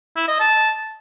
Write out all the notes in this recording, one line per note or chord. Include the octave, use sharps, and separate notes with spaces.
E4
D#5
A5